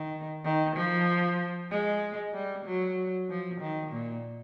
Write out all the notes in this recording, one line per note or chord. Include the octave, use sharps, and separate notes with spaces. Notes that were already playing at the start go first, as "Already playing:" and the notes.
Already playing: D#3
D#3
F3
G#3
G3
F#3
F3
D#3
A#2